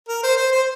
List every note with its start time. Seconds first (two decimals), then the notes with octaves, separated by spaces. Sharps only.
0.09 A#4
0.23 C5
0.37 C5
0.52 C5